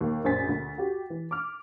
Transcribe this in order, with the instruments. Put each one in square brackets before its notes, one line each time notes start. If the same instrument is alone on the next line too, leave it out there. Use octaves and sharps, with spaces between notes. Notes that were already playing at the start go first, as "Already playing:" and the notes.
[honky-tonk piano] D#2
A#1 F#2 C5 G#5 A6 B6
D2
F#4 G4
E3
D6 F6